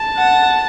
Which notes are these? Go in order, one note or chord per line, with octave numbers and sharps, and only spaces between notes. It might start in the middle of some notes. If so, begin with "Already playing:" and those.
Already playing: A5
F#5